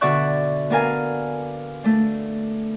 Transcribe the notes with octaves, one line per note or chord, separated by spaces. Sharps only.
B2 D3 D5 E5 C#6 F#6
B3 D4 A#4 F5 G#5
A3 D4